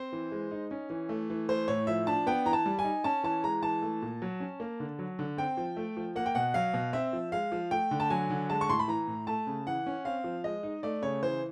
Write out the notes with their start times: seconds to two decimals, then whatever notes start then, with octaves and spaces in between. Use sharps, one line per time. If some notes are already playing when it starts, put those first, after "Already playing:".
Already playing: C4 C5
0.12 E3
0.32 G#3
0.51 D#4
0.71 C#4
0.90 E3
1.09 A3
1.30 E3
1.49 A3 C5
1.68 A2 C#5
1.87 F3 E5
2.07 D4 A5
2.27 B3 G5
2.46 E3 A#5
2.53 A5
2.66 G3
2.79 G#5
2.84 D#4
3.04 C#4 A5
3.23 E3 A5
3.44 G#3 A#5
3.62 E3 A5
3.82 A3
4.02 A#2
4.22 F#3
4.40 C#4
4.60 A#3
4.80 D3
4.99 F#3
5.19 D3
5.37 C4 G5
5.57 F3
5.77 A3
5.97 F3
6.16 A#3 F#5
6.26 G5
6.35 B2 F#5
6.54 F#3 F5
6.74 B2
6.93 C4 E5
7.13 F3
7.32 G#3 F5
7.52 F3
7.71 A3 G5
7.91 D3
8.00 A5
8.10 F#3 G#5
8.30 D3
8.49 G#3 A5
8.61 C#6
8.69 A2 C6
8.79 B5
8.88 E3 A#5
9.08 A2
9.27 A3 A5
9.47 C#3
9.67 E3 F#5
9.86 C#4
10.05 C4 F5
10.24 F3
10.44 G#3 D#5
10.63 D#4
10.83 A3 D5
11.02 C#3 C#5
11.23 E3 C5